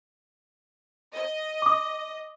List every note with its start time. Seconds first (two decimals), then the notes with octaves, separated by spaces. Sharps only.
1.14 D#5
1.62 D6 D#6